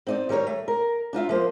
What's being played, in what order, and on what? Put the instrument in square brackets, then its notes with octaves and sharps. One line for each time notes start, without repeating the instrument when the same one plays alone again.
[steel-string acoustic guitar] C4 D#4 D5
D#3 G3 A#4 C5 C#5
A3
A#4
D4 D#4 F4 E5
F3 A#3 C5